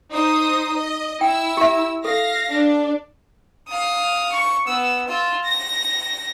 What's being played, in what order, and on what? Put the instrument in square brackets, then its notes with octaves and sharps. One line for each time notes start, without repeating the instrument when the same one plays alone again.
[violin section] D#4 C5 D#6
D#5
[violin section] E4 E6 [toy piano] G5
[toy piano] G4 E5
[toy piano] A4 [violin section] F5 A#6
[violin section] D4
[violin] F5 D#6
C#6
B3 E6
F4 E6
A#6